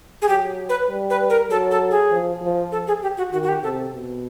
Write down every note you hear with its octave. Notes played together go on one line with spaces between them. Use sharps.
G#4
F#3 G4
B4
G3
B4
A#4
F#3 A4
A4
G#4
F3
F3
A4
G#4
G4
F#4
D#3 F#4
F#4
G4
C3 A4
B2